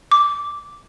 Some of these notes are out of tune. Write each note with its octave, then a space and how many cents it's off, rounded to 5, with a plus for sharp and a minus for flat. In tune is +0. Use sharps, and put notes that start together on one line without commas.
D6 -5